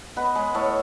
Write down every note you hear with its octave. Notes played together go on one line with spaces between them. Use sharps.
B3 B4 D#5
G#3 B4 D#5
A2 A4 C#5